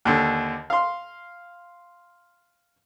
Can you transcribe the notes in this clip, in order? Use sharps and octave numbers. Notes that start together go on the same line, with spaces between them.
D#2 D3
F5 C6